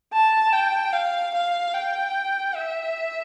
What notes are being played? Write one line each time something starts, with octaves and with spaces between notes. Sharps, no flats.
A5
G5
F5
F5
G5
E5